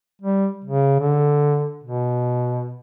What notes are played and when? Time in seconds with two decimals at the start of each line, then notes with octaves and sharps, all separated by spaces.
0.22 G3
0.65 C#3
0.99 D3
1.84 B2